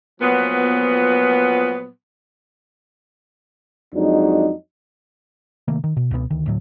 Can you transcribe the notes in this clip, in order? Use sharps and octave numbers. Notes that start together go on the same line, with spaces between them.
A#2 F3 F#3 B3
F2 F#3 G#3 D4 D#4
C3 D#3 A3 A#3
D#3
B2
C#2 B2 A3 B3
D2 D#3
D2 A2 F#3